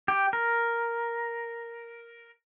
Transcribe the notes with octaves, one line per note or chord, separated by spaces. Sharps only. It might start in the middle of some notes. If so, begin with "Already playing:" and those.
G4
A#4